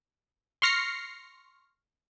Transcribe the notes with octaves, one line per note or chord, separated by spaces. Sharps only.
C6 C#6 F6 A#6 C7 C#7